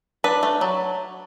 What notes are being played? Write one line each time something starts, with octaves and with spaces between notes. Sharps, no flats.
D4 B4
A3
F#3